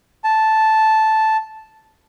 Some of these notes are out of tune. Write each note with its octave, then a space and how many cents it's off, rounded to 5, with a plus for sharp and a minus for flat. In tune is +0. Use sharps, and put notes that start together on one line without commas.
A5 -5